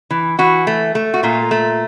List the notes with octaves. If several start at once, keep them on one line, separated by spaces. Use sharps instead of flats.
E3
E3 F#4
A3
A3
F#4
A#2 F4
A3